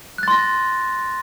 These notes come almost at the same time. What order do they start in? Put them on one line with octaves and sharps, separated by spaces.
F#6 A6 C6 A#6